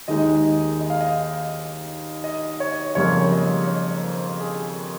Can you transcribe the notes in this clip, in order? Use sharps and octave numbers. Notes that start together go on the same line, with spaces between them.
D#2 D#3 G#3 D#4 D#5
D#5
F5
D#5
D#5
C#5
F2 C#3 G3 A#3 C#5
D#5
C#5
C5
G#4